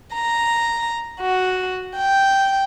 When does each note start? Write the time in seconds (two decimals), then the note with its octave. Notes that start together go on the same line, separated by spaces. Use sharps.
0.15 A#5
1.20 F#4
1.97 G5